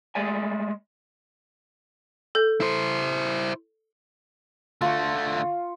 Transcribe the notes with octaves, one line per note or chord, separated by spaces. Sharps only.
G#3 A3 D5 G#5
A4 G6
E4 C5
D3 A3 F4 C#6